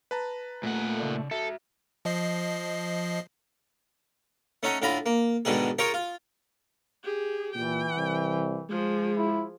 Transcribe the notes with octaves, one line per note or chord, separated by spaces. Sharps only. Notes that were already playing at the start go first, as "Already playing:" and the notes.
B4 A5 A#5
A#2 A3 F#5
C#3 D5
F#4 A4 E5
F3 D#5 C7
A3 C#4 D#4 F#5
A2 D3 F4 A#5 B5
A#3
G#2 B2 D3 D#3 G#4
F4 G#4 A#4 C#5 G5 A#5
F4
G4 G#4
A#2 E3 G5
C2
F3 G#3 G#4
E4